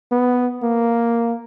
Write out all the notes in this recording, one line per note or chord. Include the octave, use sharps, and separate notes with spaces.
B3
A#3